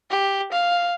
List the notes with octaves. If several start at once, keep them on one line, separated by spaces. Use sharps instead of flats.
G4
F5